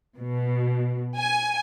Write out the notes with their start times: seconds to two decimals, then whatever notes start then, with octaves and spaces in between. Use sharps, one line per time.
0.16 B2
1.17 G#5